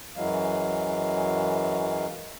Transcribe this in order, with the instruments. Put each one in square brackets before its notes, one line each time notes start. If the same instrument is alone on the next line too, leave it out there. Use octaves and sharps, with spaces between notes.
[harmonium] F#2 E3 F#3 G#3 F5